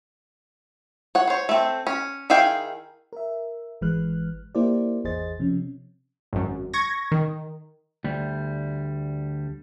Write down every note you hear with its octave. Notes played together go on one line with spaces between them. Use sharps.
C#5 F#5
C5 C#5
A3 C4
C#4
D#3 E4 G#4 F5 G5
A#4 E5
G#1 E3 G#3 B4 F6 F#6
A#3 E4 G4 A#4 C5 D5
G#1 E2 G#4 C5 D#5 A6
C3 F3 C#4
G#1 F#2
C#6 G#6 A#6
D#3
D2 G3